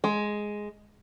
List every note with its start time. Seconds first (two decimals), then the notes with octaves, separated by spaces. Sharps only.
0.04 G#3